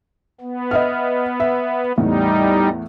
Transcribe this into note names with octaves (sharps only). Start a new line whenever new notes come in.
B3
D#5 E5 F6
E5
E2 A2 G3 B3 D#4